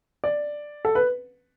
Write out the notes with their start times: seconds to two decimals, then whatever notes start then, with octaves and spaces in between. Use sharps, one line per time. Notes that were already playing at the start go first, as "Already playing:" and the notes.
0.24 D5
0.85 A4
0.95 B4